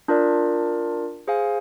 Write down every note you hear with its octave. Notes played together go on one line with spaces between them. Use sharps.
D4 F4 A#4 D5
G#4 C5 F5 G#5